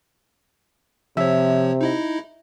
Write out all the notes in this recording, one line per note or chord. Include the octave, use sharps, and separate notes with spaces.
C3 F3 C#5 E5
D#4 E4 D#5